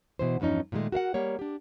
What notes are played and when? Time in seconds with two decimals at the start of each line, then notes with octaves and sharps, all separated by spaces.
0.19 B2 E3 C5
0.40 E2 G2 F3 C#4 D#4
0.72 A#2 D#3 F#3 G#3 A3
0.92 F#4 A#4 F5 F#5
1.14 G3 A#3 C#5
1.39 D4 G4